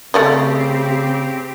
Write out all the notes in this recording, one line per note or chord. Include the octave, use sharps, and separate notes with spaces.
C#3 A3 C4 G4 D5 D#5